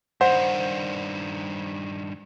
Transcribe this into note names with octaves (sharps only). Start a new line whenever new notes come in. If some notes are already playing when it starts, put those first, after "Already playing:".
G2 D#3 C5 F#5